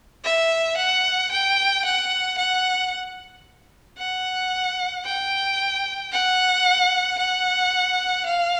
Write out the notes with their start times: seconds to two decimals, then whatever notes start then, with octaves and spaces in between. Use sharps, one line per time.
0.24 E5
0.77 F#5
1.31 G5
1.85 F#5
2.38 F#5
3.98 F#5
5.05 G5
6.12 F#5
7.19 F#5
8.26 F5